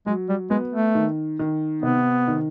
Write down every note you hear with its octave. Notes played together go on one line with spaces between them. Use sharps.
F#3 G#3
G3
G#3 B3
A3
D#3
D#3
C3 B3
D#3